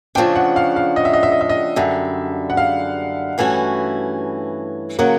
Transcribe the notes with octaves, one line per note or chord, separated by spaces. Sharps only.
C#3 F3 A3 D4 G5
F#5
F5
F5
D#5
E5
D#5
E5
D#5
E5
D#5
F#2 D3 G3 E5
F#5
F5
G2 E3 A3 C#4 F#4
C#3 F#3 A#3 F#5